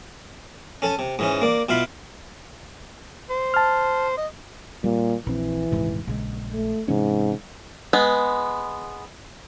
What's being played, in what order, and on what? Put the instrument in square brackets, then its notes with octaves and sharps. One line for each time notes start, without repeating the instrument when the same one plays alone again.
[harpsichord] C#4 A4 G#5 A5
C3
G#2 E3 C#4
A#3 D5
B2 E4 F4 F5 B5
[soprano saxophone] C5
[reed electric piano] A5 F6
[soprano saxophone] D#5
[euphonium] A#2 [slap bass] G3
[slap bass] A#1 C4 [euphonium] E3
[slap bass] D#1 G#2 C3
A#1 C#3 G#3
[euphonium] A3
[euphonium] G#2 [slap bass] C3 E3 C#4
[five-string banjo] G#3 B3